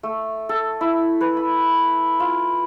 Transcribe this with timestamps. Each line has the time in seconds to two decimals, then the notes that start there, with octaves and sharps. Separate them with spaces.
0.03 A3
0.49 A4
0.81 E4
1.21 B4
1.37 B5
2.20 F4